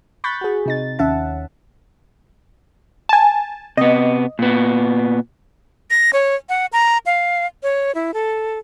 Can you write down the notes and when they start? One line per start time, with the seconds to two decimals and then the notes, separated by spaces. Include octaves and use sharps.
0.24 B5 C#6 F#6 G6 A6 B6
0.41 F#4 G#4
0.66 C3 D#4 A6
0.99 D#2 C#4 E5 F#5 A5
3.09 G#5 A5
3.77 C3 B3 D#5
4.39 A#2 B3
5.90 A#6
6.13 C#5
6.49 F#5
6.73 A#5
7.06 F5
7.63 C#5
7.95 E4
8.14 A4